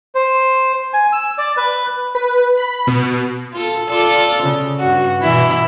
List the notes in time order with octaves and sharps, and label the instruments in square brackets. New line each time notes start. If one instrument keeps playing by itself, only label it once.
[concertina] C5
G#5
E6
D5
B4
[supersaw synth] B4
B5
B2
[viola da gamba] F4 A4
F4 A4 D5
C#3
G2 F#4
B2 E3 E4